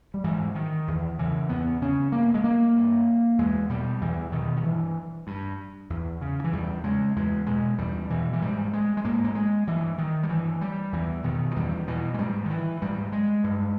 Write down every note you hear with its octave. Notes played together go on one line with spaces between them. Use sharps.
G3
G#2 E3
D#3
E2
C#3 E3
E2 B3
C#3 C#4
G2 A#3
G#3
A#3
G2
E2 G#3
B2 G3
E2 E3
B2 D#3
D#3
G2 E3
G2
E2
C#3
E3
E2 G3
C#3 G#3
E2 G#3
B2 G#3
E2 G3
B2 E3
E3
G#2 G3
G#3
G#3
G#2 A#3
A#3
G#3
G2 E3
D#3
G3
G2 E3
G3
E2 E3
B2 D#3
E3
E2 G3
B2 E3
G#3
G#2 G3
D#3
E3
G#2 G3
G#3
G2